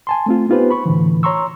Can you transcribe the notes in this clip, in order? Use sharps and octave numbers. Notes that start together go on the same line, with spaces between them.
G#5 A5 C6
A3 C4 F4
B3 D#4 F4 G4 B4 C5
B5 C#6
A2 D3 E3
C#5 A#5 C6 C#6 E6